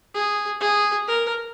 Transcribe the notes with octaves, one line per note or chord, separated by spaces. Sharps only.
G#4
G#4
A#4